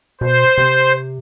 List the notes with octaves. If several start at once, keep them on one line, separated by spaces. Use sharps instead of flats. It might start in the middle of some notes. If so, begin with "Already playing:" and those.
B2 C5
C3